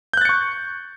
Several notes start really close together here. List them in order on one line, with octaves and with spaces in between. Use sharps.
G6 F#6 A6 C#7 C#6